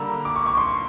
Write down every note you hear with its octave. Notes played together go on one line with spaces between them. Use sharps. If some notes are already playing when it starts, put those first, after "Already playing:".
Already playing: D3 G3 A#3 A#5 E6
D6
C#6
C#6
C6